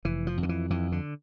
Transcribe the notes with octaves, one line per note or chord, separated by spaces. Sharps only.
F1 E3
F3
F2
D3
E3
F2 E3
D3